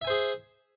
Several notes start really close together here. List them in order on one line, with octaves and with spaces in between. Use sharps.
E5 G#5 C5 G#4